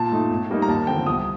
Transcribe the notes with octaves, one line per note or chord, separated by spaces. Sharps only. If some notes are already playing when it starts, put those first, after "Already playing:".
Already playing: A#2 A5
A3 D#4
A2
G3 A#3 D#4
A#5
D#2 A5
D3 F3 C4 G5
C2 D#6